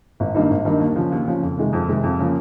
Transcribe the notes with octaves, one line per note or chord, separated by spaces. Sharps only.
G#1
G2 D#3 A#3 D#4
G#1
G2 D#3 A#3 D#4
D#2
C#3 F3
D#2
C#3 F3
F2
C3 D#3 G#3
F2
C3 D#3 G#3
F2
C#3 F3 A#3